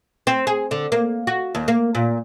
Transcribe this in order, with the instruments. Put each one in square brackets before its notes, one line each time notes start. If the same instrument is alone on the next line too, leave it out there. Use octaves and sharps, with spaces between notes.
[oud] C4
G#4
D3
A#3
F#4
D#2
A#3
A#2